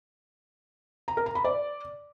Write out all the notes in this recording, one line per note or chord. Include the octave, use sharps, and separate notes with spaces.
A#5
A#4
A#5
B5
D5